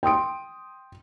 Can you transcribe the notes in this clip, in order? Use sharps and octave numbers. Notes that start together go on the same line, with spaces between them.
G5 C6 D#6 D7